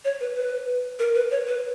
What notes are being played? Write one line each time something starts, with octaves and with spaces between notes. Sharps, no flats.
C#5
B4
B4
A#4
B4
C#5
B4